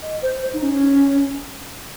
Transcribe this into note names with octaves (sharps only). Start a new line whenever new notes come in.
D#5
C5
C5
D#4
C#4